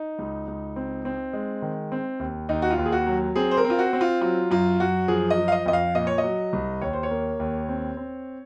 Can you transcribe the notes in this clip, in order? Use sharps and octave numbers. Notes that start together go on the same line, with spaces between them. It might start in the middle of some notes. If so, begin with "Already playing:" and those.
Already playing: D#4
C#2
C#2
C4
C4
G#3
D#3
C4
D#2
D#2 D#4
F#4
F4
D#2
G#4
F#4
F#3
C4 G#4
C5
A#4
C4
F4
F#4
C4
F4
F#3 F4
F#2 F4
F#2 F#4
F3 G#4
D#5
F3
F5
D#5
F2 D#5
F5
A#2 D#5
C#5
D#5
F#3
C2
D#2 C#5
C5
C#5
A#3
D#2
C4
C4